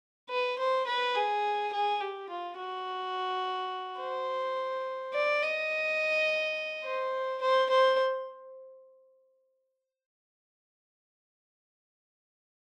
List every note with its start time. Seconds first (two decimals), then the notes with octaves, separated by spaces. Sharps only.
0.29 B4
0.58 C5
0.86 B4
1.15 G#4
1.72 G#4
2.00 G4
2.29 F4
2.58 F#4
4.00 C5
5.13 D5
5.42 D#5
6.85 C5
7.42 C5
7.70 C5